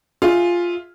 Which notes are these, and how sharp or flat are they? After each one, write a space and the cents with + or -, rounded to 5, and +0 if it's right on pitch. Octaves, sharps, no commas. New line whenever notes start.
F4 +0 G#4 +0 E5 -5